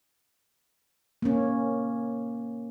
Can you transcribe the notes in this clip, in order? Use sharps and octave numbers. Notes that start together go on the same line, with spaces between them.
A#3 C#4